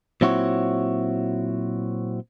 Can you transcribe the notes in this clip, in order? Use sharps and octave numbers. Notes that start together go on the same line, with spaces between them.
A#2 F#3 C4 E4 F#4 C#5